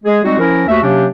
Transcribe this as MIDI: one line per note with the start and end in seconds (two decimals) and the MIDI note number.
0.04 0.19 56
0.04 0.19 68
0.23 0.37 55
0.23 0.37 56
0.23 0.37 60
0.23 0.37 63
0.23 0.37 66
0.38 0.63 53
0.38 0.63 61
0.38 0.63 64
0.38 0.63 70
0.68 0.79 39
0.68 0.79 57
0.68 0.79 66
0.68 0.79 76
0.82 1.06 48
0.82 1.06 54
0.82 1.06 58
0.82 1.06 61
0.82 1.06 62
0.82 1.06 67